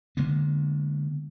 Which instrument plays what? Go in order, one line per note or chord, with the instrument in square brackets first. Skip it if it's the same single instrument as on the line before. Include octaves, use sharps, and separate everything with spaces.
[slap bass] D3 G#3 A#3 B3